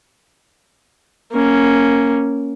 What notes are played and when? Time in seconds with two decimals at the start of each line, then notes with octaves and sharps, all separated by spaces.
1.32 A#3 C#4